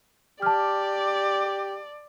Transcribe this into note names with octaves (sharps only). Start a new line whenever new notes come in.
G4 D5 A5 F6